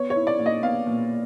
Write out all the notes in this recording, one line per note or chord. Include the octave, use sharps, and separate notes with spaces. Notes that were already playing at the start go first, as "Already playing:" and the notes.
Already playing: B3 C#5
C#5
E4
D5
A#2
D#5
B3 F5
A#2